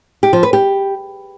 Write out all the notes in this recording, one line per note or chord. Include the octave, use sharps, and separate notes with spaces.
G4
F3
B4
G4